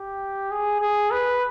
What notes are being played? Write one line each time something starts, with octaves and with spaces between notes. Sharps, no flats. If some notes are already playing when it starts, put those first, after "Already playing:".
Already playing: G4
G#4
G#4
B4